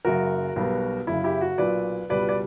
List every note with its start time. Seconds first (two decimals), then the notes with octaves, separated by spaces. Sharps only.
0.05 F#1 F#2 C#3 F#4 A#4
0.56 B1 B2 G3 B3
1.07 F#1 F#2 C#3 E4
1.24 E4 G4
1.41 F#4
1.58 B1 A#2 F#3 B4 D5
2.10 C#2 B2 G3 B4 D5
2.29 D5